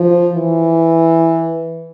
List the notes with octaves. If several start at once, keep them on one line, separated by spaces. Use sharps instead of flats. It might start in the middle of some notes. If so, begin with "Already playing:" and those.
Already playing: F3
E3